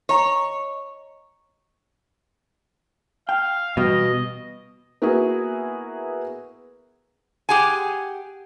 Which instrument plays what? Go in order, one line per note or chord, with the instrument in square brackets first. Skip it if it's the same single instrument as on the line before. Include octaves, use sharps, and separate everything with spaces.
[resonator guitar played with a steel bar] C#5 [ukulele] D#5 A#5
[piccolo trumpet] F5 [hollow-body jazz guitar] G5
[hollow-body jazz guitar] E2 G3 [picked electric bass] B2 [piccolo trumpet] D#5
[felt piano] A#3 B3 E4 F#4 G#4
[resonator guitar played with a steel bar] G4 G#4 F#5 G#5